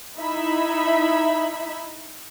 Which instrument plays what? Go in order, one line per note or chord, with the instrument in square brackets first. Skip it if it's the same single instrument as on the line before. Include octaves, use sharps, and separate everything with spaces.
[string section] D#4 E4 E5 B5